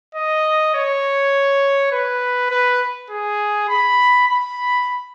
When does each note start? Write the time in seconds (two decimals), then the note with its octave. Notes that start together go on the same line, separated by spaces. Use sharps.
0.15 D#5
0.74 C#5
1.92 B4
2.51 B4
3.10 G#4
3.69 B5
4.28 B5